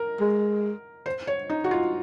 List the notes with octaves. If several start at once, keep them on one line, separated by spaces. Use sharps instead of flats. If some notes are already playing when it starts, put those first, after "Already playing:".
Already playing: A#4
G#3
C5
C#5
D#4
F#4
F4